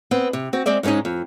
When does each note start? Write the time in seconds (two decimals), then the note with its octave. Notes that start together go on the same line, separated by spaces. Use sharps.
0.11 B3 C4
0.33 C3
0.53 C4 F#4
0.66 G#3 C4 C5 D5 E5
0.83 G#2 G#3 C4 C#4 D#4
1.05 F2